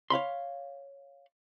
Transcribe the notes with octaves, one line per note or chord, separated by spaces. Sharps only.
C#5 F5 B5 C6